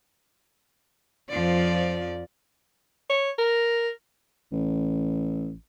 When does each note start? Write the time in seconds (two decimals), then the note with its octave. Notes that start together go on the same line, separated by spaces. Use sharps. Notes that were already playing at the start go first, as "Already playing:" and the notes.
1.29 F2 F3 D5
3.09 C#5
3.38 A#4
4.52 A1